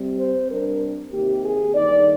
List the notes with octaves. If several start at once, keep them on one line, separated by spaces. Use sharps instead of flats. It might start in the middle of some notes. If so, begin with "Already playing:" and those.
Already playing: C3 G3 C4
C5
C3 G3 D4 A#4
C3 D#3 A#3 G4
G#4
G2 D#3 A#3 D#4 D5